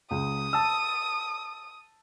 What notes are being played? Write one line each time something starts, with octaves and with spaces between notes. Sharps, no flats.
C#2 D#6
A5 E6